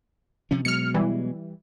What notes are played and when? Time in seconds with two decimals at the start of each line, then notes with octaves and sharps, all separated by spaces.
0.51 C3 F3 C#4
0.65 B2 F#3 G#3 F6 C#7
0.94 E3 G3